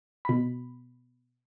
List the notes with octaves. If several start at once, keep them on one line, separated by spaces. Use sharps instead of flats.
B2 B5